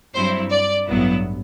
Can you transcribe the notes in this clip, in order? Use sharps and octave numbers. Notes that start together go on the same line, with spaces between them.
G2 F#3 C4 E4 C5
D5
A1 G2 F#3 B3 E4